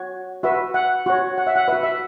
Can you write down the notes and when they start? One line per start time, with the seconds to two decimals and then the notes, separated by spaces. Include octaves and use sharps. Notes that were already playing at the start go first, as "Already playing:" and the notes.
Already playing: F#4 C#5
0.43 F#4 B4 E5
0.74 F#5
1.06 F#4 C#5
1.38 F#5
1.47 E5
1.56 F#5
1.68 B4 E5
1.73 F#4
1.83 E5